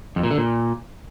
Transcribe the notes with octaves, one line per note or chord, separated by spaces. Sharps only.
F2
A#2
D3
A#2